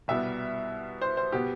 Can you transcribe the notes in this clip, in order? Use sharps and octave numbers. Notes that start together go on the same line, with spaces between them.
C2 B2 G3 B3 E5
C5
C5
B2 B3 G4